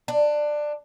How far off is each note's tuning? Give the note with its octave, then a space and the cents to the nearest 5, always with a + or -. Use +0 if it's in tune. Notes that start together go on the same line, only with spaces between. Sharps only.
D4 +15